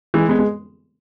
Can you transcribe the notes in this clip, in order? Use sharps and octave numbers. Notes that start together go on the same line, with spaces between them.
E3 G#3
G#3 B3
G#3